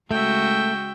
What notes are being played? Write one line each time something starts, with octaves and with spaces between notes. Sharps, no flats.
C#3 G#3 A3 F#4 E5 G5